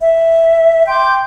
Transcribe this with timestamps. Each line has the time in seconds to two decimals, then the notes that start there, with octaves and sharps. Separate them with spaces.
0.01 E5
0.88 G5 C6 D6 G6